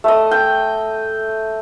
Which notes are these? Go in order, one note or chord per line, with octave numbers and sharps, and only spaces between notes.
A3 D#5
G5